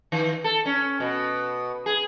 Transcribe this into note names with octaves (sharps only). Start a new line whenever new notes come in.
D#3
A4
C#4
B2
G#4